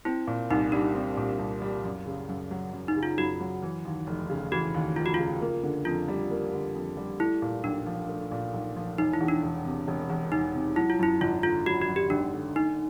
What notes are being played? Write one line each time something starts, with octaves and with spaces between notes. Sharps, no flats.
C4 E4
A#2
C2 D#4
G3 D4
C4
A#2
C2
G3
F#2
C#3
F#2
F#3
F#2
D#4
C#3
F4
F#2 F#4
F#3
E3
D#2
F1
C#3
E3 F#4
D#2
F1 F4
F#4
C#3 F4
A#3
D3
F2 F4
G3
A#3
D3
F2
G3
A3 E4
A#2
B1 D4
F3
A3
A#2
B1
F3
E1 D#4
E4
E2
D4
E1
C3
E1
E2
E1 D#4
C3
F#3 E4
F4
F#2 E4
G#1 F4
D3 F4
F#3 F#4
F#4
F#2
G4
G#1 D4
D3
A3 D#4